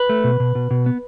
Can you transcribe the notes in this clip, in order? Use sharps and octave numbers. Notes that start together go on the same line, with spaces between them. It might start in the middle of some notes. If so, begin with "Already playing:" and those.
Already playing: B4
A3
B2
B2
B2
B2
B3